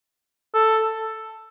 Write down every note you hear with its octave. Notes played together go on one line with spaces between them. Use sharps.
A4